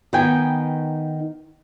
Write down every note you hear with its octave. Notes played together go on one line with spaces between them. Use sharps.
D#3 B3 D#4 B4 G5 G#5